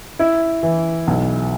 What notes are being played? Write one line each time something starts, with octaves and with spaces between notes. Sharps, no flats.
E4
E3
B1